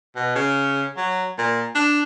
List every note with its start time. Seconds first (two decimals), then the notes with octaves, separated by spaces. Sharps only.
0.16 B2
0.35 C#3
0.97 F#3
1.38 A#2
1.75 D4